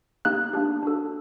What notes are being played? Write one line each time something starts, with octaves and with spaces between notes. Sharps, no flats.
A#3 D#4 G4 F#6
A#3 D4 G4
D4 F#4 A4